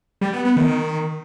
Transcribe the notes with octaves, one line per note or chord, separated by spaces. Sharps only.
G3
B3
B3
D#3